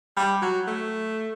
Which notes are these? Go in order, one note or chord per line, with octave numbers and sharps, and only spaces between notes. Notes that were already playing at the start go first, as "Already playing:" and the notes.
G3
F#3
A3